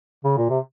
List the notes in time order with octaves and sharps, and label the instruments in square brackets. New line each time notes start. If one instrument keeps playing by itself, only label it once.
[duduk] C#3
A#2
C3